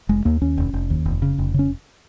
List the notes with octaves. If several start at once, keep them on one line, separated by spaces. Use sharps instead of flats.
F1 G#3
D#2 A#3
D#2 C#4
F1
F1
D#2
F1
C#3
F1
C#3 C#4